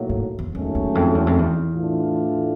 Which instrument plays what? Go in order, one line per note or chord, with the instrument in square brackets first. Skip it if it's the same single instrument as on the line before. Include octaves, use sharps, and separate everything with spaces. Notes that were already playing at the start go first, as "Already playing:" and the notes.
Already playing: [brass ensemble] B1 A2 F#3 A#3
[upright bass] G#2
E2
[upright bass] E2 [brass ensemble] G#2 D#3 F#3 A3 C#4
[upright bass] E2
F2
E2
F2
E2
[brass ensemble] A2 E3 A3 D4 F4